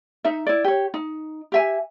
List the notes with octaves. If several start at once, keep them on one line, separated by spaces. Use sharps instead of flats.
D#4 E5
E4 D5
G4 C#5
D#4
G4 E5 G#5